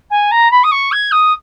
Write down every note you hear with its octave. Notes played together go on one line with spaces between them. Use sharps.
G#5
A#5
B5
D#6
C#6
G#6
D#6